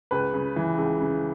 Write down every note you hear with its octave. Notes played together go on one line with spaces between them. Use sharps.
C#2 B4
C#3
E3
C#2
C#3